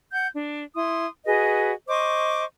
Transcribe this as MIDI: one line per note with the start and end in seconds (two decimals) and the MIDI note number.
0.13 0.27 78
0.13 0.27 91
0.35 0.63 62
0.75 1.07 64
0.75 1.07 84
0.75 1.07 87
1.26 1.72 66
1.26 1.72 68
1.26 1.72 71
1.26 1.72 75
1.87 2.44 72
1.87 2.44 75
1.87 2.44 85
1.87 2.44 86